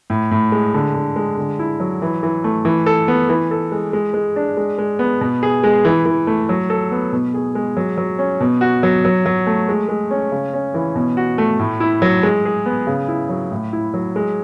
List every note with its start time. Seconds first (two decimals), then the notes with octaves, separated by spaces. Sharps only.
0.10 A2
0.31 A2
0.52 G#3
0.74 D3
0.94 D3
1.16 G#3
1.38 D3
1.59 E4
1.80 F#3
2.02 E3
2.23 E3
2.44 A3
2.65 E3
2.86 A4
3.08 B3
3.29 E3
3.51 A4
3.72 G#3
3.93 G#3
4.14 G#3
4.36 D4
4.57 G#3
4.78 G#3
4.99 B3
5.21 B2
5.43 G#4
5.64 G#3
5.85 E3
6.06 E3
6.27 A3
6.49 F#3
6.70 A4
6.91 B3
7.13 B2
7.34 G#4
7.55 G#3
7.77 F#3
7.98 F#3
8.19 C#4
8.41 B2
8.61 F#4
8.83 F#3
9.05 F#3
9.26 F#3
9.47 A3
9.69 G#3
9.89 G#3
10.11 C#4
10.32 C#3
10.54 C#4
10.74 E3
10.95 B2
11.17 F#4
11.38 A3
11.59 A2
11.80 E4
12.02 F#3
12.23 G#3
12.45 G#4
12.66 B3
12.87 C#3
13.08 E4
13.29 F#3
13.51 A2
13.73 E4
13.94 F#3
14.16 G#3